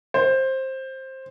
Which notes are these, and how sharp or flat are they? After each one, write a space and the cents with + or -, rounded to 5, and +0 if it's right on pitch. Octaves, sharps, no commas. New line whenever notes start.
C5 +15